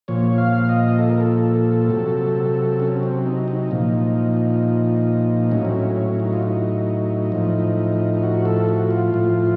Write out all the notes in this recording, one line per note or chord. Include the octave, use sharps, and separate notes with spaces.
A#2 F3 C#5
F5
D#5
A4
A#4
A4
C3 F#3
C#4
C4
D#4
D#4
A#2 F3
A2 F#3 C#4
C4
C#4
C#4
D#4
F4
D#4
A2 F3
F#4
A4
F#4
F4
A2 F3